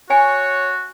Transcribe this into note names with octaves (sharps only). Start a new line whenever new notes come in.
F#4 C#5 G#5